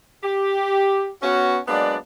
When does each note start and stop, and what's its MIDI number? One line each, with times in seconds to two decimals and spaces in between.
0.23 1.10 67
1.22 1.58 59
1.22 1.58 61
1.22 1.58 66
1.67 1.95 54
1.67 1.95 56
1.67 1.95 58
1.67 1.95 59
1.67 1.95 62
1.67 1.95 74